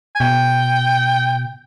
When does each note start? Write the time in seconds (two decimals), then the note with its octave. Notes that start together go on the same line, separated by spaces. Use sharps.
0.15 G#5
0.20 B2 G5